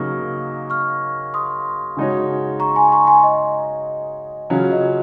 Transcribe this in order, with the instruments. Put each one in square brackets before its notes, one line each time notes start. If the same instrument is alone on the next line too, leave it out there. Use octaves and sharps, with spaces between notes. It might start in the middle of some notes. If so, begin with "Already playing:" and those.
Already playing: [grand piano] C#3 F#3 A#3 D#4 [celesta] C#6 F6
[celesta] C#6 F6
C6 D#6
[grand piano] C#3 G#3 D#4 F#4 C#5
[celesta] A#5 C#6
G#5 C6
A#5 C#6
G#5 C6
D#5
[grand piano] C#3 F#3 C#4 F4
[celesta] D#5